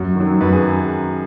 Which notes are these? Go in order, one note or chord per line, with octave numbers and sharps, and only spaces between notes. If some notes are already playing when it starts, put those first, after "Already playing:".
Already playing: F#2 F#4
D#3 F#3
F#2 B4
G#4